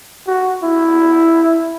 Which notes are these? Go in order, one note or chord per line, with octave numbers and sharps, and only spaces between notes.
F#4
E4